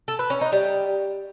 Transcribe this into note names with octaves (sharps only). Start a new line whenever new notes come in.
A4
B4
C#4
D#4
G3